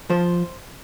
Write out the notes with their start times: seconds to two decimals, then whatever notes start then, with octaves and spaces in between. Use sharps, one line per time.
0.10 F3 C5